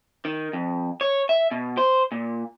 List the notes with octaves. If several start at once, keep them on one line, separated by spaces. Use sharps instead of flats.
D#3
F2
C#5
E5
B2
C5
A#2